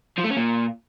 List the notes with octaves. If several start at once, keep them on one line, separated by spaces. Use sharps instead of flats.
F3
A3
C#4
A#2